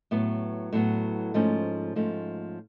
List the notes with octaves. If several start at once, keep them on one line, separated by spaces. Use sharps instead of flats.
A2 F#3 B3
A2 F#3 B3
G#2 F3 A3 C#4
G#2 F3 A3 C#4